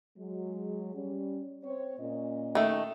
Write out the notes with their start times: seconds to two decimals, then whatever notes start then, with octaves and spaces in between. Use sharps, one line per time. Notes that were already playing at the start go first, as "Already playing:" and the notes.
0.17 F#3 G#3
0.94 G3 C#4
1.64 C4 C#5
1.99 A#2 C#4 D#5
2.55 D#3 A3